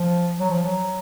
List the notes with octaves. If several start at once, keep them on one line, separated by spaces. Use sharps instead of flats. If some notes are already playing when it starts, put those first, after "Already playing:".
Already playing: F3
F#3
F3
F#3